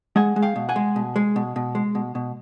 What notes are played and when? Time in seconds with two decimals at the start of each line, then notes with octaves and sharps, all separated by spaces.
0.16 G#3 F#5 G#5
0.36 G#3
0.42 F5 G5
0.56 B2
0.69 F#5 G#5
0.76 G#3
0.96 B2
1.16 G#3
1.36 B2
1.56 B2
1.75 G#3
1.95 B2
2.15 B2